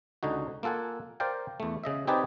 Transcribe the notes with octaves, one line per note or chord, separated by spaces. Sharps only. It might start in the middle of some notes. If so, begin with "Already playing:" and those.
C#2 D3 D#4 F#4
A#3 F4 A4 F#5 G#5
A#4 C5 D5 F5 G5
E2 A3
C#3 D#5 E5
C4 D#4 G4 G#4 B4 D5